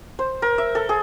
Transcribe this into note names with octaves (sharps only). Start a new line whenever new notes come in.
C5
A#4
E5
A4
G#4